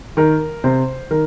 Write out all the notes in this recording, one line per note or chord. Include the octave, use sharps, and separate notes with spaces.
D#3 A#4
C3 C5
D#3 A#4